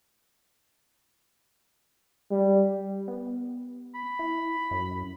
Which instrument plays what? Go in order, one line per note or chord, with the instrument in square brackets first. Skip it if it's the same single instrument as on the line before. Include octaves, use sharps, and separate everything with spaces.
[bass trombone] G3
[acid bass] B3
[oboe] B5
[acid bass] E4
F#2